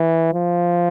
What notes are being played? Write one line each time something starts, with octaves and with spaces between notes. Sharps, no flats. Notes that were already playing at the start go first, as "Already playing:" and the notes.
Already playing: E3
F3